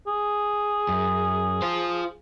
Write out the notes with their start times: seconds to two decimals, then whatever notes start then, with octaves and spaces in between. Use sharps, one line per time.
0.07 G#4
0.88 F#2
1.62 F4 C5